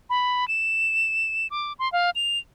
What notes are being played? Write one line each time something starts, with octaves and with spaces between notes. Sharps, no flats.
B5
E7
D6
C6
F5
F7